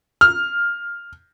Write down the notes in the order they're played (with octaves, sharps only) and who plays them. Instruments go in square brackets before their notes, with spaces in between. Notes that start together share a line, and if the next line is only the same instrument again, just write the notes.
[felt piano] F6